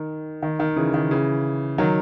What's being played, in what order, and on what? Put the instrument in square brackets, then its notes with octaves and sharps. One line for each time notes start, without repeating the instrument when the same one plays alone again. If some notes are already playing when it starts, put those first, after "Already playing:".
Already playing: [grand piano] D#3
D#3
D#3
C#3 E3
D#3
C#3 E3
D#3 F#3